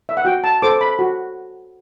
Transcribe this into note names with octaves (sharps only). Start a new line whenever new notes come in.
E5
F#5
F#4 G5
A5
A4 C5 D6
B5
F#4